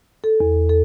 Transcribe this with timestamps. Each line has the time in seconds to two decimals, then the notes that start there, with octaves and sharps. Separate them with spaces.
0.24 A4
0.40 E2
0.69 A4